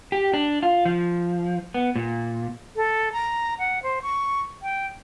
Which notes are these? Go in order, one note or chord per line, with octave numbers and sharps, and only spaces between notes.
G4
D4
F4
F3
B3
A#2
A4
A#5
F#5
C5
C#6
G5